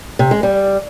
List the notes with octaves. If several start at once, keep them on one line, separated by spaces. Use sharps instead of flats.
C3
G#3
G3